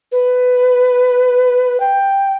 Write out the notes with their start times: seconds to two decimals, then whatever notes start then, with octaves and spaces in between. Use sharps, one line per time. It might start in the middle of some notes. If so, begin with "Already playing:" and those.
0.12 B4
1.80 G5